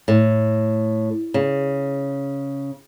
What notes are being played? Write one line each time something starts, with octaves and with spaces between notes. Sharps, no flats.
A2
C#3